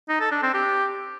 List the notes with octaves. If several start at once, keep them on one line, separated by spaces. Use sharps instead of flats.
D#4
A4
D4
C4
G4